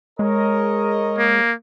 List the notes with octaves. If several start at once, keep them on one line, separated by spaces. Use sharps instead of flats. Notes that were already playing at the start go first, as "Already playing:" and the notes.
G#3 A#4 C#5 D#5
A#3